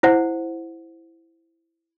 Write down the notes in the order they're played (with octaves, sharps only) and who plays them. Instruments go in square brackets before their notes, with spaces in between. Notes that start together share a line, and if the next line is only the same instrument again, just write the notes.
[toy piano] E4 C5 F#5